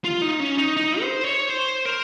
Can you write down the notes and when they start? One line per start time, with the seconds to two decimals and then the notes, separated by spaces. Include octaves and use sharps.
0.04 F4
0.22 D#4
0.40 C#4
0.58 D#4
0.77 D#4
1.01 C5
1.24 C#5
1.49 C5
1.85 A#4